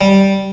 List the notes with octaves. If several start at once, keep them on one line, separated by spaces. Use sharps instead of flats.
G3